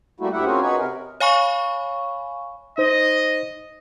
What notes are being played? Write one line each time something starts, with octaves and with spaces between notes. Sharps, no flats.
G3 A3 A#3 E4 F#4
D2 E4 G4 E5 F#5
A#3 C4 C#4 F4 F#4 G#4
D#4 F#4 G#4 B4 C#5
C3 A#4
C#5 F5 G#5 B5 C#6
D#4 C5 D#5